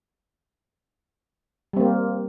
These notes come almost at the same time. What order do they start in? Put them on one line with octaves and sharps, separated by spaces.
G3 C4 A#3